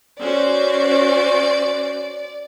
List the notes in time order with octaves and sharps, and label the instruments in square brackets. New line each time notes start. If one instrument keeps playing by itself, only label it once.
[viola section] C#4 F#4 C5 [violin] D5